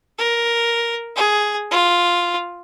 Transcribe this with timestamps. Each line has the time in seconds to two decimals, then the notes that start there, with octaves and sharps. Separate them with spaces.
0.18 A#4
1.16 G#4
1.71 F4